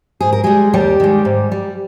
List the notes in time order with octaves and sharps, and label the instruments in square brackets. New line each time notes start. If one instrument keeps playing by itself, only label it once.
[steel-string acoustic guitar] G#2 G#4
A#4
G3 G#3 G#4
D#2 G3 G4
D#3 G#3
G#2
G3